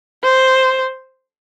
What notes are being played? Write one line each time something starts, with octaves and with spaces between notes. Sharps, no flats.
C5